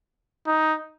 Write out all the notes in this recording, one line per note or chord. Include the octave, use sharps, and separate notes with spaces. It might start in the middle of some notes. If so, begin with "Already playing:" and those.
D#4